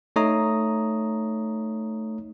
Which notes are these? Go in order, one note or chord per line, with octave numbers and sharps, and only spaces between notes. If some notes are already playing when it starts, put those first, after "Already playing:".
A3 D#4 C#5 A#5 D#6